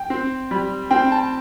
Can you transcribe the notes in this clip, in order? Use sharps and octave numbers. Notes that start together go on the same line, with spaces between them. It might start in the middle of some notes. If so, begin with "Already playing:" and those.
Already playing: G5
C4
G3
C4 G5
A5